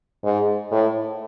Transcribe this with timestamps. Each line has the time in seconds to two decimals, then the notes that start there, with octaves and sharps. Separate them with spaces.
0.24 G#2
0.71 A2